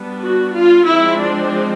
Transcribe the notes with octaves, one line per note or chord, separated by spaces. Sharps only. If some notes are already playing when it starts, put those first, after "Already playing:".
Already playing: G3 B3 D4
F#4
F4
F3 G#3 C4 E4
D4